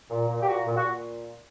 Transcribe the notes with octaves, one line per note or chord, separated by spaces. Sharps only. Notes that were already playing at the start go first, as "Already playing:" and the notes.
A#2
A#2
G4
A#2 F#4
A#2
F#4
A#2